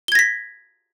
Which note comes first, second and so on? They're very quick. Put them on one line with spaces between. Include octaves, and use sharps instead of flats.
G7 G#6 A#6 B6